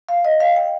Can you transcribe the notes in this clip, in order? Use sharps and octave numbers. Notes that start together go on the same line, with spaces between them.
F5
D#5
F5
G5